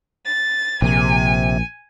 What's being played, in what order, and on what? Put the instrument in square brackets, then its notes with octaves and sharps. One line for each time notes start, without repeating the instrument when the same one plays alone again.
[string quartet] A6
[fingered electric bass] A#1 [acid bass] C3 [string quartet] G#5